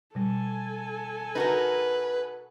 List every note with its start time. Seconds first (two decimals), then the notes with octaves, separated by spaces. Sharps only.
0.15 B2 G3 A4 G#5
1.35 D#4 F#4 A#4 B4